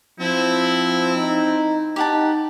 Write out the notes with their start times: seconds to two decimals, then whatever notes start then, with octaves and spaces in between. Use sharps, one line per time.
0.20 F3 C4 E4
1.16 D#4
1.96 D#4 G4 F#5 A5